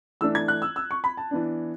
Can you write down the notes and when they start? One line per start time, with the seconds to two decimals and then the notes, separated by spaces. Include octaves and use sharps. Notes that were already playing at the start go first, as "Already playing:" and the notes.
0.21 E3 A3 D4 E6
0.35 G#6
0.48 F#6
0.62 E6
0.76 E6
0.91 C#6
1.04 B5
1.17 A5
1.31 E3 B3 D4